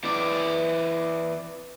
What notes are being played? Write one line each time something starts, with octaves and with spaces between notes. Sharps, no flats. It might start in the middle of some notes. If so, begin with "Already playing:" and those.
E3 D5